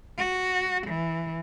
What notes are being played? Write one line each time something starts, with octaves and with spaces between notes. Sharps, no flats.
F#4
E3